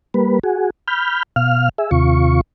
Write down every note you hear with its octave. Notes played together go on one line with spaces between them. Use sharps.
G3 A#3 B4
F#4 G#4
B5 F6 G6
B2 F5 F6
G#4 E5
D#2 C3 F4 C#6